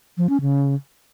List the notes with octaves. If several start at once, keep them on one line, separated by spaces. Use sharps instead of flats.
F3
C#4
C#3